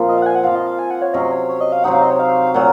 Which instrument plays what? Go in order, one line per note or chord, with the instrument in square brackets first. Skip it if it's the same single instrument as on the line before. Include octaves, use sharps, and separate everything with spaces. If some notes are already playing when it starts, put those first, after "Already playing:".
Already playing: [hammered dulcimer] A#2 F3 C4 F4
[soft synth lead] D#5
F5
F#5
G#5
F#5
[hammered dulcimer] F3 C4 F4 [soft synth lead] F5
[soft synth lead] D#5
F5
G#5
F#5
C#5
[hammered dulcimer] C3 F#3 C#4 [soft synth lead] D#5
[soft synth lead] C#5
C#5
D#5
F5
[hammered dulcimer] C3 F#3 C4 D#4 [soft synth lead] F#5
[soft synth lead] F5
D#5
C#5
F5
[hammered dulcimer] A#2 F#3 [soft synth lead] F#5